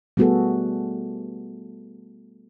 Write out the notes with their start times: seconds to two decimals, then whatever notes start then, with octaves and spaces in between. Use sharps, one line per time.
0.17 G3 A3 B3 F#4 G#4 A4